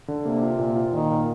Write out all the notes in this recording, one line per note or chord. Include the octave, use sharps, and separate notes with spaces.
D3
C3 A#3
F4
A#2
F4
A#2 D#3
A#2